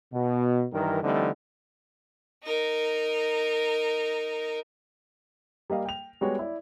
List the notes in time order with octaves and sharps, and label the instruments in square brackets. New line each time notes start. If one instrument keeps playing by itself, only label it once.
[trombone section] B2
G2 D#3 E3 A#4
D3 E3 G3 A3 C4 D#4
[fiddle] D#4 A#4
[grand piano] G3 A#3 D#5 F5
G5 F7
G3 G#3 B3 F#4 C#5
E4 D5